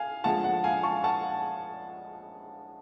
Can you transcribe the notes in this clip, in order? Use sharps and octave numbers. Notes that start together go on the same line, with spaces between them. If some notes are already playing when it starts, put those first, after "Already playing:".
Already playing: F5 G#5
D3 F3 G#3 F#5 A5
F#5
F5 G#5
A5 C#6
F#5 A5